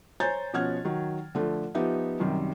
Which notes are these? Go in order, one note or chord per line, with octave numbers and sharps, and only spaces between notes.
C5 C#5 G#5 A#5 G6 A6
B2 F3 C#4 F#5 F6 G#6
D#3 F#3
D3 F3 A3
F3 B3 D#4 G4 E5
F#2 C3 D#3 G3